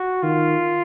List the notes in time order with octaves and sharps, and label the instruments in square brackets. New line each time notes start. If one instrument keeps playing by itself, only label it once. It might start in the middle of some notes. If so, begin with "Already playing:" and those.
Already playing: [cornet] F#4
[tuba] D#3 [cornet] F4